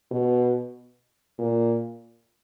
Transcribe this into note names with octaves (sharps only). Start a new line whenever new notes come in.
B2
A#2